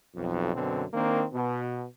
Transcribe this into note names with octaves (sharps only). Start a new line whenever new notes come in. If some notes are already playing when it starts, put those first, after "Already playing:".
B1 F2
F#2 B2 D3 C4
D#3 A#3 C4 D4
B2 B3